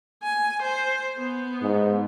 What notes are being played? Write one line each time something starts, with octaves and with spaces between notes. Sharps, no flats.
G#5
C5
B3
G#2